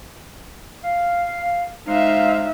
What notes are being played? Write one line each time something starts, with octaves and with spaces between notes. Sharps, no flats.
F5
G#3 D#4 C5 E5 F5